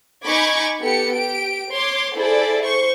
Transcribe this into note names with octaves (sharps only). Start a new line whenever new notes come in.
D#4 G#5 B5 C#6 D6 G#6
B3 G4 A4 C#7
G4 D7
C#5 C6 D6
E4 G#4 A4 C5 D5
C5 C#6